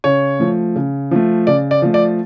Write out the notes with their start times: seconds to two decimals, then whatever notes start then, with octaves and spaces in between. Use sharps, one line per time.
0.04 C#3 C#5
0.40 F3 A3
0.76 C#3
1.11 F3 A3
1.47 C#3 D5
1.71 D5
1.82 F3 A3
1.94 D5